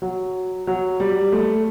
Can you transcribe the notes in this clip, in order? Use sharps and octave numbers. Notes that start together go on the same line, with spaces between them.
F#3
F#3
G3
A3